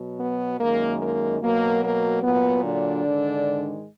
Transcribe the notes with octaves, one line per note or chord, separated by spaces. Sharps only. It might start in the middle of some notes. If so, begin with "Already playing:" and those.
Already playing: B2 F#3
B3
F#2 D#3 G#3 A#3
A#3
B2 F#3 A#3
A#3
A#2 F#3 B3
D3 D4
G#2 D#3 G#3